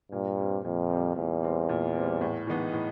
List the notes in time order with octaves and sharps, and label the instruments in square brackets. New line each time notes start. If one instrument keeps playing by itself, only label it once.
[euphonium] G2 [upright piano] A#2
[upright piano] G3 C4
[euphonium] F2 [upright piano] A#2
[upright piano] G3 C4
[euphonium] E2 [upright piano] A#2
[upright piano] G3 C4
A#2
G3 C4
A2
E3 G#3 B3 D#4
A2